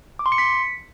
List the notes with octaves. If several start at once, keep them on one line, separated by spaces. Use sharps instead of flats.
D6
C6
C#7
B6